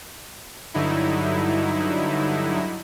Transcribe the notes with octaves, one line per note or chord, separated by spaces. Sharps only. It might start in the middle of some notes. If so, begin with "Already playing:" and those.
G2 D3 F#3 D#4 E4